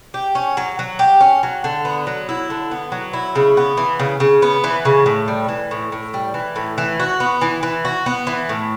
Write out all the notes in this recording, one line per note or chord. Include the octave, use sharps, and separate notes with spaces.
G4
C#4
F#3
F#3
G4
C#4
F#3
D3
B3
F#3
E4
D3
B3
F#3
E4
C#3
B3
E3
C#3
C#3
B3
E3
C#3
A2
G3
E3
A2
A2
G3
E3
A2
E3
F#4
B3
E3
E3
F#4
B3
E3
A2